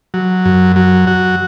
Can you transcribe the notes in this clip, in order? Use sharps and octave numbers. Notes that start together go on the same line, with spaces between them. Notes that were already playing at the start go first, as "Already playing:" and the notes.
F#3
F#2
F#3
F#4